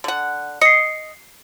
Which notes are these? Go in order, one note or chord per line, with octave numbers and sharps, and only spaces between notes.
D3 F#5
D#5 C7 C#7